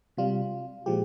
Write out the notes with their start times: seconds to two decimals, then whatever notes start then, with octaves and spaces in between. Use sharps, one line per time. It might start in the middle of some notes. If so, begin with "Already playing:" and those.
0.17 C3 G3 F4
0.86 A#2 F3 G#3 G4